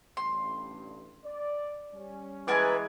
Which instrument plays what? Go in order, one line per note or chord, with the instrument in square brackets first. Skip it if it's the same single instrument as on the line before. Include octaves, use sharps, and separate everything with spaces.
[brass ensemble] A1 G2 [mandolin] C6
[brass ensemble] D5
G3 C#4
[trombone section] E3 G#3 [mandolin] A#4 G#5 A5 [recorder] B4